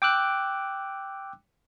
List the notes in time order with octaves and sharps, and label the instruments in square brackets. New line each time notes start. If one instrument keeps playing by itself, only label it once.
[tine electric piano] G5 D6 E6 F#6